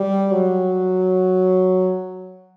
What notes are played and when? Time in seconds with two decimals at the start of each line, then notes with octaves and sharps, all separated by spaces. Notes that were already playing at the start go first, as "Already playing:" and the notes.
Already playing: G3
0.32 F#3